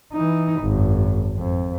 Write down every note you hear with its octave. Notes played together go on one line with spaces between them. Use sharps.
E3 D#4
G#1 F#2
F2